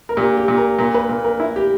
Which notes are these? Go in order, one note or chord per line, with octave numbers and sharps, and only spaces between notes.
A#4
A#2 G4
G4
A#2
A#4
A#2 A#4
B4
A#2 A#4
A#4
E4
G4